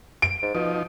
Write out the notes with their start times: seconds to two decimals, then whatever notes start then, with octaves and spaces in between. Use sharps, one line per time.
0.22 D7
0.42 G#2
0.55 B2 F3 D#4